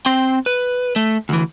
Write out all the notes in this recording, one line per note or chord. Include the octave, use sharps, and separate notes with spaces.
C4 G5
B4
A3
D2 E3